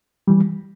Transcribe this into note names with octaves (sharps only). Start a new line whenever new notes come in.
E3 G3